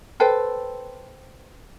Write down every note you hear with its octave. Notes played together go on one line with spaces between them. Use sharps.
A4 B4 C5 G5